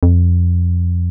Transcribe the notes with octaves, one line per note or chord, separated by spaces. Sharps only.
F2